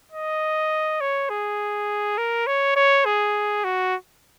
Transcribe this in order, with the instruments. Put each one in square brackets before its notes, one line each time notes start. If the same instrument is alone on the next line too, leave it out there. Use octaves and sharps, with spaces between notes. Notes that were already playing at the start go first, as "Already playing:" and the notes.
[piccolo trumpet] D#5
C#5
G#4
A#4
C#5
C#5
G#4
F#4